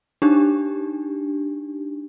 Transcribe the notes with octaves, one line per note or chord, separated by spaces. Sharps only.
D4 D#4 G4